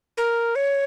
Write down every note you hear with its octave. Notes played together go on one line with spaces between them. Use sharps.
A#4
C#5